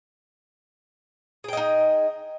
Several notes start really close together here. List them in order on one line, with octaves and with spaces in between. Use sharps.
G#4 G5 D#5 D#4